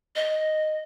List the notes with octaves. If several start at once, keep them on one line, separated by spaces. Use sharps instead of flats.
D#5